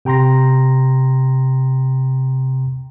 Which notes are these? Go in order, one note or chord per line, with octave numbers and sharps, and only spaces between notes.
C3 G5 A#5 C6 A#6